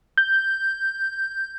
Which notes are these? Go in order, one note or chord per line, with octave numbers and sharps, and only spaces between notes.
G6